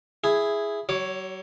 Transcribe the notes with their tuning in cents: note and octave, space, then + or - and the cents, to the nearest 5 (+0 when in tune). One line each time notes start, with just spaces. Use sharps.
E4 +5 G#4 +0
F#3 +40 C#5 +0 D6 +0